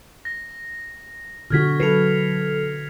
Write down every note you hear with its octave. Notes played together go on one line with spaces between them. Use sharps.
A#6
B2 D3 F#4 F6 G#6 B6
F#3 A4 B4 C7 C#7 F7